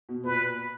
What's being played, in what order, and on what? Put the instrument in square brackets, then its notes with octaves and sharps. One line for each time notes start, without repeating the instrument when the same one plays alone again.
[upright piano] B2
[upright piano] A#2 [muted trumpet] B4